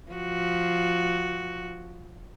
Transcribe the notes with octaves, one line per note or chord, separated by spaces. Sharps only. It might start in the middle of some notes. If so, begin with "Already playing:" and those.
F3 F#4